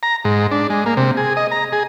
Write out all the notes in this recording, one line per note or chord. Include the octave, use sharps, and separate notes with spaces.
A#5
G#2
D4
G#3
A#3
C3
G#4
D#5
A#5
G#4